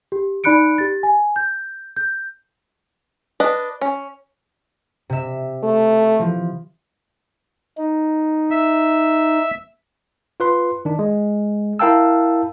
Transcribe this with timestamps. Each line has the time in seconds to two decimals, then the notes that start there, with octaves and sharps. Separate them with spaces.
0.12 G4
0.44 D#4 D5 B5 F#6 C#7 D7
0.78 G4 A6
1.03 G#5
1.36 G6
1.96 G6
3.40 D4 B4 D#5
3.82 C#4
5.10 C3 E5
5.64 A3
6.19 E3 F3
7.78 D#4
8.51 E5
10.40 F4 B4 C6
10.85 D#3 D4
10.99 G#3
11.79 E4 A#4 F5 G5 A5 E6